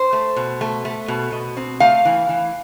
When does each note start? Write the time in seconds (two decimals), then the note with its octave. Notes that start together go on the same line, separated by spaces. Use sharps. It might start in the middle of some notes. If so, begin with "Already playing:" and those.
Already playing: C5
0.13 A3
0.36 B2
0.61 A3
0.85 A3
1.08 B2
1.32 B2
1.57 C4
1.80 A3 F5
2.05 E3
2.29 E3